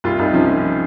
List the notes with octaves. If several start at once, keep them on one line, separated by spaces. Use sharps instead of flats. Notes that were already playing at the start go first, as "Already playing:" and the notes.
C2 F4
C2 D#4
F3 C#4
F3